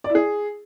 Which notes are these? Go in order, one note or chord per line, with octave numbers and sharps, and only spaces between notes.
D5
E4
G#4